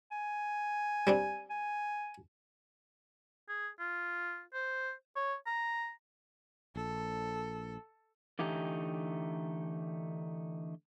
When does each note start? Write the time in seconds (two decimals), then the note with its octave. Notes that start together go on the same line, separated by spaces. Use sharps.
0.11 G#5
1.07 G3 C4 D4
1.50 G#5
3.49 G#4
3.80 F4
4.54 C5
5.16 C#5
5.47 A#5
6.76 A#1 A4
8.39 D3 E3 A3 D#4 G4